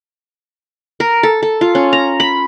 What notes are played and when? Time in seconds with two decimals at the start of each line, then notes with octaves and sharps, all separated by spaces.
1.00 A#4
1.23 A4
1.43 A4
1.61 F4
1.75 C#4
1.93 A#5
2.20 B5